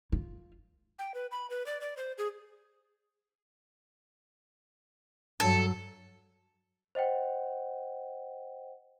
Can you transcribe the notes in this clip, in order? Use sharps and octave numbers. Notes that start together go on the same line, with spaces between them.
F4
G5
B4
B5
B4
D5
D5
C5
G#4
G2 F#3 A4
C5 D#5 F#5 G5